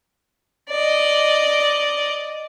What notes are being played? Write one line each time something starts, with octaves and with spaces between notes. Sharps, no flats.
D5 D#5